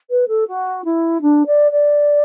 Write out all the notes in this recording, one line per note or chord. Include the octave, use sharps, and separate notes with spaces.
B4
A4
F#4
E4
D4
D5
D5